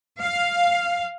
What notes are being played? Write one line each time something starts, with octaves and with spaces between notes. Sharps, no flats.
F5